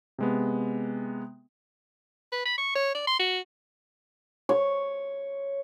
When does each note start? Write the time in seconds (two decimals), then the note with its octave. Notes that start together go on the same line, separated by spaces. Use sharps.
0.18 C3 G#3 B3
2.32 B4
2.45 B5
2.58 C#6
2.75 C#5
2.95 D5
3.07 C6
3.19 F#4
4.49 C#5